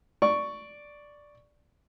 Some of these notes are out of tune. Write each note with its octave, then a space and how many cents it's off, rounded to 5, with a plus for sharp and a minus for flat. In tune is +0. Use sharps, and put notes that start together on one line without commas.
D5 +0 C#6 +5